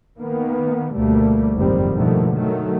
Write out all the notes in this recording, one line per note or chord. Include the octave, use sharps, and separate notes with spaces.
D#3 A#3 B3
D2 B2 G3 A3 A#3
F#1 F2 G#2 D#3 G3 C4
B2 D3 D#3 F3 A3 A#3
D#3 F#3 A3